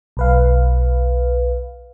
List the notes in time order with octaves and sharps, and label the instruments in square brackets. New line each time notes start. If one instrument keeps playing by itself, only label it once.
[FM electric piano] B1 B4 F5